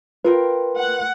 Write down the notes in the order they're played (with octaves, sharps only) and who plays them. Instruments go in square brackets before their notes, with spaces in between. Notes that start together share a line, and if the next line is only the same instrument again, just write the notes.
[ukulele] F4 A#4 G5 [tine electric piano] B4
[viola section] F#5